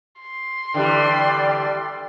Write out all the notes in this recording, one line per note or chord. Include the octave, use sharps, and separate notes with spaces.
C6
D3 E3 G3 D5 G5